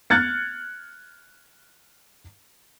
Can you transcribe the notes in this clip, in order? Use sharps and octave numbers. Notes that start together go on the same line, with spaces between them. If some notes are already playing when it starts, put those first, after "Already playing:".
F6 F#6 G#6 A6 C#7